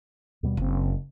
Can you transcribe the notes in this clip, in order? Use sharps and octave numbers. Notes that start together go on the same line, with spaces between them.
D#2 B2 G3
F#1 C#3 C4